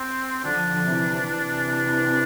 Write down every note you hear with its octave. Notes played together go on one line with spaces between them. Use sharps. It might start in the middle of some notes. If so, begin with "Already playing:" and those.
Already playing: C4
D3 F3 D4
C3 E3
C3 E3